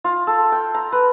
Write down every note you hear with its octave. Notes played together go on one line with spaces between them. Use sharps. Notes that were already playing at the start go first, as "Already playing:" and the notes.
F4
A4
G5
A#5
B4